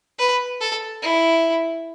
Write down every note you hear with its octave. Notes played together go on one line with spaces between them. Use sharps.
B4
A4
E4